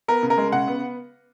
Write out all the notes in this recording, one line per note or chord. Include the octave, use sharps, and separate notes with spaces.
B3 A#4
C#3
A#4
G#3
C#3 F#5
B3